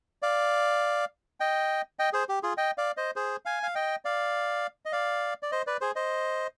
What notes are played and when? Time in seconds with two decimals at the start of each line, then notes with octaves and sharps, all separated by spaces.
0.22 D5 F5
1.40 D#5 G5
1.99 D#5 G5
2.13 G#4 C5
2.29 G4
2.43 F4 G#4
2.57 D#5 G5
2.78 D5 F5
2.97 C5 D#5
3.16 G#4 C5
3.45 F5 G#5
3.63 F5
3.75 D#5 G5
4.05 D5 F5
4.85 D#5
4.92 D5 F5
5.43 D5
5.52 C5 D#5
5.67 B4 D5
5.81 G#4 C5
5.96 C5 D#5